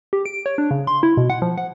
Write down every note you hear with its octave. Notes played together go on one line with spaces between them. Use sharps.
G4
D7
C#5
D4
C#3
C6
E4
B2
F#5
F3
F#5